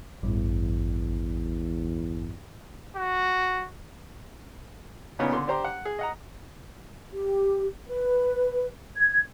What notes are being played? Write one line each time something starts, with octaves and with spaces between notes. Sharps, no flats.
A1 E2 G2
F#4
A#2 C#3 B3 C#4 D#4
D3 C6
D4 G4 C5 A#5 C6
F#5
G#4
D#5 F#5 A#5
G4
B4
G#6